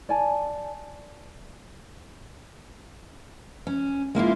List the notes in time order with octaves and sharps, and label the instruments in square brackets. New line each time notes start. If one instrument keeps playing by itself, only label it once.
[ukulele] D5 G#5 A5
[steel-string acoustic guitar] C#4
G#3 A#3 E4 F4